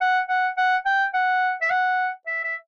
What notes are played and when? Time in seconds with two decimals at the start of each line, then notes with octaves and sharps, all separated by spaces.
0.01 F#5
0.29 F#5
0.57 F#5
0.86 G5
1.14 F#5
1.62 E5
1.70 F#5
2.27 E5
2.44 E5